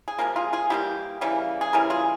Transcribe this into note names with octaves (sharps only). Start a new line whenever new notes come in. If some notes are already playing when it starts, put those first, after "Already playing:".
G#4
C3 F3 A#3 A#4
F4 G#4
F4 G#4
E3 G3 A#3 E4 G4
C#3 E3 G3 A#3
G#4
C#3 E3 G3 A#4
F4 G#4